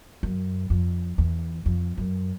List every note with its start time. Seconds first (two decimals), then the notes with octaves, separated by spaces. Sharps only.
0.23 F#2
0.70 F2
1.18 E2
1.66 F2
1.98 F#2